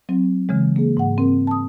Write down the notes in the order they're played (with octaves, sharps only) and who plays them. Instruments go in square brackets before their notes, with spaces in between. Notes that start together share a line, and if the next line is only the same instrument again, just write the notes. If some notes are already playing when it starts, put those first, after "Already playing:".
[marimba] F#3 C4
C#3 E3 G#3
A#3 G#4
G#2 F#5
C4 A#4
A5 D#6